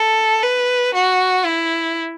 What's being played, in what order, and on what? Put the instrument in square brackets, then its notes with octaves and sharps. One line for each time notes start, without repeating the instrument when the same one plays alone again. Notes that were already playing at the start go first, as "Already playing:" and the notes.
Already playing: [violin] A4
B4
F#4
E4